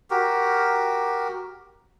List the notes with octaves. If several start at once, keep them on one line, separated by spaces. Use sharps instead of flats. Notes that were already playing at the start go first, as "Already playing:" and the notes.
F#4 G4 A#4